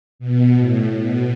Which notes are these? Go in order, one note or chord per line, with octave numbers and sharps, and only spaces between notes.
B2
A2
B2